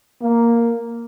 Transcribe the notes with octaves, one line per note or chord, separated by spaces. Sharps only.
A#3